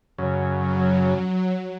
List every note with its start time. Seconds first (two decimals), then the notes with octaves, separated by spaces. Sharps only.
0.18 F#2 C#3
0.54 F#3